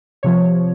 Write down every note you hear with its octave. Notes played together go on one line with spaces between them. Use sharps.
C3 F3 C#5